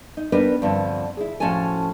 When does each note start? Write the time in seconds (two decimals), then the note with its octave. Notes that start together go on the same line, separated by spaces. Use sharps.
0.17 D#4
0.32 G3 B3 D4 D#4 A#4 B4
0.62 G2 D3 F3 C4
1.17 E4 G#4
1.40 A2 F3 C#4 F#4 A4 G#5